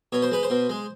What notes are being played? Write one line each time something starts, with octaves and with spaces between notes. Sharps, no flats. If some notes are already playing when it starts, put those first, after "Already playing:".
B2 C#5
C5
G#3 B4
C5
B2
G#3